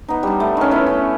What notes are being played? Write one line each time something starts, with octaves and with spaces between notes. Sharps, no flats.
B3 D#4
G3 D4
A3
D#3 C#4
B3 C#4 E4 B4
C#4 C#6